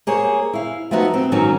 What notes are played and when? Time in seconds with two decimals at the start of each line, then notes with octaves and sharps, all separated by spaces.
0.07 A#3 G#4 C5 C#5
0.53 E4 F5
0.91 F3 A3 B3 D#4 F#4
1.14 C4
1.32 G#2 D#3 F#3 C#4